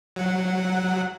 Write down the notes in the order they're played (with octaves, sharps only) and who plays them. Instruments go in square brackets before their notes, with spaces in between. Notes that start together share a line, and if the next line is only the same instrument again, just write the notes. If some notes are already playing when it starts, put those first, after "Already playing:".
[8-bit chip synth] F#3 F#5